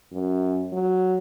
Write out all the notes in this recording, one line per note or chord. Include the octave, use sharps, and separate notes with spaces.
F#2
F#3